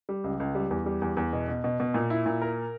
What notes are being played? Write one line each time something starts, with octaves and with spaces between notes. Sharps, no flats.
G3
C#2
C#2
G3
E2
G3
E2
E2
B2
B2
B2
B2
A#2
E4
A#2
A#4